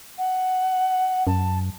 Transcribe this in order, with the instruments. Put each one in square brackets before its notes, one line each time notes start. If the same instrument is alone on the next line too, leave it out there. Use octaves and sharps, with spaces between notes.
[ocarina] F#5
[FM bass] F#2 [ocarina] A5